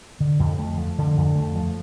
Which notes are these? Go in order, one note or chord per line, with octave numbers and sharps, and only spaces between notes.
D3
F2
A3
F3
D3
F2
A3
F3